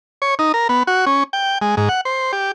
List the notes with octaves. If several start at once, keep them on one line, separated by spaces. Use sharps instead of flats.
C#5
D#4
A#4
B3
F#4
C#4
G5
G#3
G#2
F#5
C5
G4